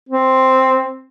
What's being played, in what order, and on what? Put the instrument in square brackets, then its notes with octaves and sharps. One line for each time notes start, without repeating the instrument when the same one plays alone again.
[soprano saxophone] C4